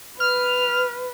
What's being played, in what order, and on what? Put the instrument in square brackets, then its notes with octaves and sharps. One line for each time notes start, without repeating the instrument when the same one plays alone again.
[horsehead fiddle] B4 [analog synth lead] F6